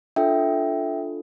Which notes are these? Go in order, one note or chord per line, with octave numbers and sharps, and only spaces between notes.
D4 F4 A4 E5 G5